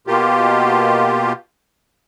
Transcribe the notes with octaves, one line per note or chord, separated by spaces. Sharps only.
B2 A#3 F4 G4